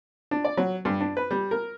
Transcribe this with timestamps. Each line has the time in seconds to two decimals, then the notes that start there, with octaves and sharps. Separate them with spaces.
0.31 D4
0.45 D5
0.57 F#3
0.85 G2
1.01 D4
1.17 B4
1.31 G3
1.51 A#4